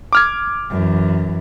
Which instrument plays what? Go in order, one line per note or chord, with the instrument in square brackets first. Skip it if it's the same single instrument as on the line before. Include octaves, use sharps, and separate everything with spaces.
[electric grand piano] D6 F6 G#6
[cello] F#2 E3